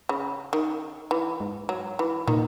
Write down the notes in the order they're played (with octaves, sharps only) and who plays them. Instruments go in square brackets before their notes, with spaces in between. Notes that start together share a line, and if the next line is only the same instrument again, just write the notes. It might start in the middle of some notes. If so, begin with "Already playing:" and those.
[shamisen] C#3
D#3
E3
[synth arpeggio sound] G#2
[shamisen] F#3
E3
[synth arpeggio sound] A#2 [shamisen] D#3